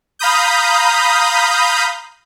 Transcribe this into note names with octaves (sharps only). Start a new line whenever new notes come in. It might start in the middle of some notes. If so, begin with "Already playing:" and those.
F5 A#5 B5 D#6 G6